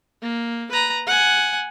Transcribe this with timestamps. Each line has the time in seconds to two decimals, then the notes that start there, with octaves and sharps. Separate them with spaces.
0.22 A#3
0.71 B4 A#5
1.07 F#5 G#5